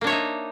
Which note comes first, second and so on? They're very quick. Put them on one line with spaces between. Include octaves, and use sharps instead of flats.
A#3 D4 C#5 E5 D#4